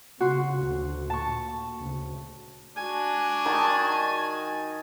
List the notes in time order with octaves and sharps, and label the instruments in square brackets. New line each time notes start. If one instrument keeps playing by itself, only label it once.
[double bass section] C#3 [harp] F#4 C6
[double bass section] D2 D3
[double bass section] A#2 [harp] A5 C#6
[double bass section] D2 C#3
[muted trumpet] D4 [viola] F#4 G#5
[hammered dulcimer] D#3 D#4 A5